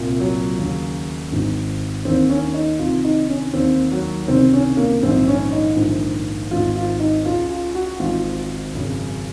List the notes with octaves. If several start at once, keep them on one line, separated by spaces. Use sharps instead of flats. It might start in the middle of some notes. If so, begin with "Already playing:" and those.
Already playing: C2 A#2
F#3
D#2 C#3
G#1 G#2 D#3
D#2 D#3 C4
C#4
D#4
C2 C3 D#3 F4
D#4
C#4
D#2 D#3 C4
F#3
C#2 C3 D#3 C4
C#4
A#3
A#1 G#2 D#3 C4
C#4
D#4
A#1 G#2 D#3
G#1 G#2 D#3 F4
F4
D#4
C#2 C#3 F4
F4
F#4
G#1 G#2 D#3 F4
G#1 F#2 C#3